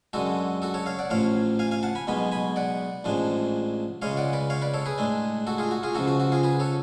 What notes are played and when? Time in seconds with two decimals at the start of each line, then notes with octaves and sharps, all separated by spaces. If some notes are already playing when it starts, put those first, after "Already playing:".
0.13 F#2 D3 G#3 F#4 A4
0.62 F#4 A4
0.74 A4 C#5
0.86 C#5 F5
0.99 D5 F#5
1.10 A1 A2 F3 C#5 F5
1.59 F5 G#5
1.71 F5 G#5
1.83 F#5 A5
1.95 G#5 B5
2.07 B1 B2 G#3 B3 G#5 B5
2.32 G#5 B5
2.56 D5 F#5
3.04 A1 A2 F3 G#3 D4
4.02 C#2 C#3 G#3 C#5 F5
4.17 D5 F#5
4.33 B4 D5
4.50 C#5 F5
4.62 B4 D5
4.74 A4 C#5
4.86 G#4 B4
4.98 A2 G#3 D4
5.47 F#4 A4
5.58 F4 G#4
5.71 F#4
5.83 F4 G#4
5.95 C#2 C#3 F3 F#4 A4
6.08 F#4
6.20 F#4
6.32 F4 G#4
6.43 G#4 B4
6.60 A4 C#5